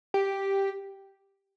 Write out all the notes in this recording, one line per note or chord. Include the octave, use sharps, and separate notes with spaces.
G4